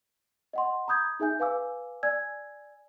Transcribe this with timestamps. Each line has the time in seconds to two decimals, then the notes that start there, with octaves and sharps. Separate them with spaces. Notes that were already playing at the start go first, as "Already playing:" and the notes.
0.53 D#5 F#5 C6
0.88 A#5 B5 D#6 G6 G#6
1.20 D#4 G#4 E5 G#5 G6
1.40 B4 F5 G#5 D6 E6
2.03 D5 G#5 E6 G#6